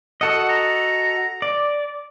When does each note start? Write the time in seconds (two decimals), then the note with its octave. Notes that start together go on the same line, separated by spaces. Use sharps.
0.21 F#4 A4 D#5 F#5
0.49 A#5
1.42 D5